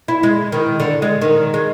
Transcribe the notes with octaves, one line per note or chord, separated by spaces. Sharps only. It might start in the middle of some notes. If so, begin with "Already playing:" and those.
E4
G#3
D#3
D3
G#3
D#3
G#3